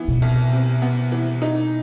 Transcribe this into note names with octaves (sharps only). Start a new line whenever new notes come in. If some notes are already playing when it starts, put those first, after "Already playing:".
Already playing: E3 B3
B2
C2
C3
B3
E3
D#4